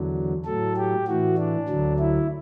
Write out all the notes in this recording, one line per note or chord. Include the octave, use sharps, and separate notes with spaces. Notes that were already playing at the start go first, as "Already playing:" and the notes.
Already playing: E2 D3 F#3
A2 F#3 A4
G4
A2 E3 F#4
D4
D2 D3 F#3
E4